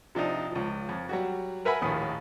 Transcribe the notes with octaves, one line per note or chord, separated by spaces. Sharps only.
C3 F3 D4 D#4
C#2 F3
F2
F#3 G3 F#4
A#4 B4 E5 F#5 G#5 B5
A#1 D#2 A2 B5 D#6